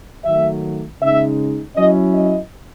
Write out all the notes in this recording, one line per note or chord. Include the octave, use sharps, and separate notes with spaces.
D#3 F#3 A3 E5
C#3 G#3 D#4 E5
F#3 C#4 E4 D#5
D#5